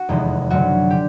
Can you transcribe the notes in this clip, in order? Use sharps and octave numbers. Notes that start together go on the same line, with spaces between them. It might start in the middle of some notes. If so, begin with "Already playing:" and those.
Already playing: F#4
F1 E2 C3 D#3 G#3
F#1 F#2 D3 F#3 A3 F#4
D3 G4